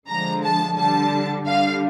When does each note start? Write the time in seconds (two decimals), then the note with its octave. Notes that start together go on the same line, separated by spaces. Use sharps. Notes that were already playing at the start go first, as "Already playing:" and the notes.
0.08 D3 F3 G#3 A#5
0.44 A5
0.77 D3 G3 A5
1.47 D3 G3 F5